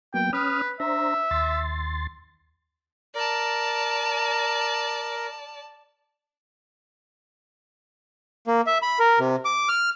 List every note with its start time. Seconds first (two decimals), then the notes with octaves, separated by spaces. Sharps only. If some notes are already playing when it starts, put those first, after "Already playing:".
0.14 F#3 A#3 B3 G5
0.33 C#4 B4 D#6 F6
0.80 D4 C5 E5 A#5
1.31 D#2 C6 A6
3.15 A#4 D5 A5
8.47 A#3
8.67 E5
8.82 B5
8.99 A#4
9.19 C3
9.45 D6
9.69 F6